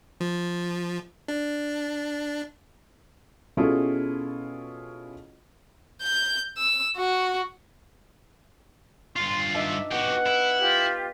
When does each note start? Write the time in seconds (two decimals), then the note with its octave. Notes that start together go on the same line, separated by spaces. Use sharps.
0.21 F3
1.28 D4
3.57 B2 C#4 E4 F4 G#4 A4
6.02 G6
6.58 E6
6.96 F#4
9.16 G2 F4 C6
9.54 D4 D#4 D5 E5
9.91 B3 F#4 G4 F#5
10.26 E4 B5
10.59 F4 G4